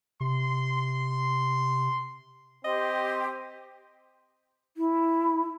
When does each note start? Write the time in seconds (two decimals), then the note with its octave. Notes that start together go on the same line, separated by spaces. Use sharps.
0.20 C3 C6
2.65 C4 G4 D#5 C6
4.77 E4